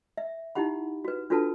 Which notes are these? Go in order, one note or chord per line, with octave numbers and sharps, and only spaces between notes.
E5
D#4 E4 G4 F#5 B5
F#4 B4
D4 F4 F#4 A4 B4 A5